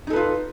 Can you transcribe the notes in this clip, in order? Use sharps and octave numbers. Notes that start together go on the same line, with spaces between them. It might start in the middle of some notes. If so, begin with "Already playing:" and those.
D#4 F4 A4 B4